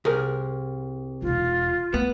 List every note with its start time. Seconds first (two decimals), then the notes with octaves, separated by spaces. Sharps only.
0.05 C2 G#4 A#4
1.22 E1 D#4 F4
1.94 A3 B3